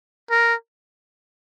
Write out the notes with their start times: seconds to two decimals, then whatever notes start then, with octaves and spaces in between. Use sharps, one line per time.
0.30 A#4